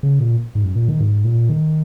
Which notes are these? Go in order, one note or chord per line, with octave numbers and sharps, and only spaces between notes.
C#3
A#2
G#2
F#2
A#2
D#3
G#2
A#2
D#3